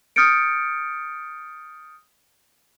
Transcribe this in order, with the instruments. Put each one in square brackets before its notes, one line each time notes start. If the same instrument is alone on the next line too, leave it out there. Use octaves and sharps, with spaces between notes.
[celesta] D#6 F6 G6 A6 C#7 D7